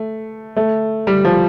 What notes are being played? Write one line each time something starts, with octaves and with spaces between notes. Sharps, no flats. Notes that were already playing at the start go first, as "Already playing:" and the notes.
Already playing: A3
A3
G3
F3